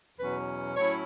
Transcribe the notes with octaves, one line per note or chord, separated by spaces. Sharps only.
E2 B2 F#3 C#4 B4
A2 F#3 C#4 E4 C#5